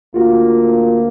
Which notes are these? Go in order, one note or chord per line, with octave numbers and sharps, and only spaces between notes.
D2 A#3 F4 F#4